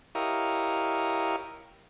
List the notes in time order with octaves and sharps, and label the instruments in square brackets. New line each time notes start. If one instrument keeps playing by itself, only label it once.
[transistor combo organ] E4 G4 A#4 C#5 D#5 F5